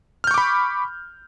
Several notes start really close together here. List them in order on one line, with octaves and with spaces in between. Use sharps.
F6 G6 C#6 D6 B5